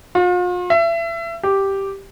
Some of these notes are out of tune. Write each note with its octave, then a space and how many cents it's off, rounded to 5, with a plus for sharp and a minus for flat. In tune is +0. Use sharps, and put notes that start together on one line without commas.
F4 +40
E5 +30
G4 -5